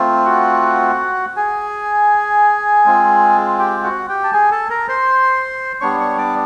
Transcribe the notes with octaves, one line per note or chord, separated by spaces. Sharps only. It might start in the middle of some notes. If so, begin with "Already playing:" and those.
Already playing: A3 C4 F4
F#4 F#5
G#4 G#5
G#3 C4 F4
G4 G5
F#4 F#5
G4 G5
A5
G#4 G#5
A4 A5
A#4 A#5
C5 C6
G3 B3 D4 C#5 C#6
C#5 C#6
D5 D6